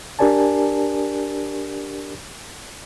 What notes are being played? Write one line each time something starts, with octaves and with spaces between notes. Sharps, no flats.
D4 G4 A#4 D5 G#5 A5